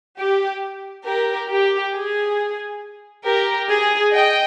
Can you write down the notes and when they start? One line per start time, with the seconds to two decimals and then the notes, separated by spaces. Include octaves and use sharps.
0.19 G4
1.06 G4 A#4
1.50 G4
1.94 G#4
3.26 G4 A#4
3.69 G#4
4.13 D#5 G5